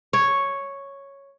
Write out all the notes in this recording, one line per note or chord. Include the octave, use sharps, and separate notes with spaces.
C#5